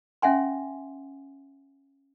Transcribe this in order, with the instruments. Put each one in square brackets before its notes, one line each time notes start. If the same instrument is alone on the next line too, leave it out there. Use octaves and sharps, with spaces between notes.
[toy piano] C#4 E5 F#5 G#5 C6